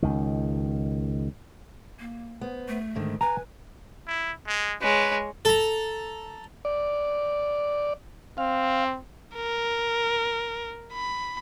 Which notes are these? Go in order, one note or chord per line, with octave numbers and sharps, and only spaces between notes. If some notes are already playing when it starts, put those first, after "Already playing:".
C#2 D#3
A#3
B3 C5
A3
G#2 D3 D#3
B4 G#5 A#5
E4
G#3
G#3 B4 C#5
A4 A#5
D5
C4 F5
A#4
B5